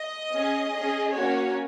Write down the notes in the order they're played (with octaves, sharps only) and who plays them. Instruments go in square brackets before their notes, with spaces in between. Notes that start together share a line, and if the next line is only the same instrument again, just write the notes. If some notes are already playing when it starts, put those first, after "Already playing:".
Already playing: [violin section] D#5
C#4 G#4
C#4 G#4
A#3 C#4 F#4 C#5